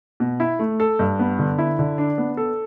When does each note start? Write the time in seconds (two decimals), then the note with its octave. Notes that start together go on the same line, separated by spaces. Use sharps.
0.20 B2
0.40 E4
0.59 A3
0.80 A4
0.99 G2
1.19 B3
1.39 D3
1.59 E4
1.79 D3
1.98 D4
2.18 B3
2.37 A4